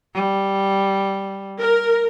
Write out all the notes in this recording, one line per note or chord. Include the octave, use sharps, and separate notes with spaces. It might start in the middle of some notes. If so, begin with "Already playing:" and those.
G3
A#4